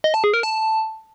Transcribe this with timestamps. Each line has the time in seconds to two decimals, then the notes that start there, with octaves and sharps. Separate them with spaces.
0.04 D#5
0.14 A5
0.24 G#4
0.34 A#4
0.43 A5